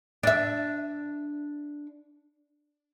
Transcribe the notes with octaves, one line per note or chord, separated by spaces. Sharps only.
D4 E5